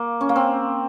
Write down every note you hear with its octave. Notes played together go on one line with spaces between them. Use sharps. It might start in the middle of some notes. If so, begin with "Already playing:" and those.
Already playing: A#3
C#4
A#3
C4